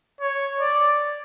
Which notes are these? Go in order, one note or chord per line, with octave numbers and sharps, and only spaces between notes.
C#5
D5